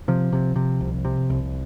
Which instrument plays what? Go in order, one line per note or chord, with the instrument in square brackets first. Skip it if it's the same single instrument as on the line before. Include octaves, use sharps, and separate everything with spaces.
[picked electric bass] C3 F3
C3
C3
C2
C3
C2